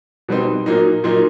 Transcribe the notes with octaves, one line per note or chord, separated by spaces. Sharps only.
B2 G3 C4 D#4
A#2 F#3 A#3 D#4
A#2 F#3 A#3 D#4